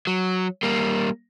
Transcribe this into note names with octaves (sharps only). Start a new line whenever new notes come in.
F#3
G3 A#3